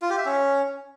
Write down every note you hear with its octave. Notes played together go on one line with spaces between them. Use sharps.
F4
G4
E5
C#4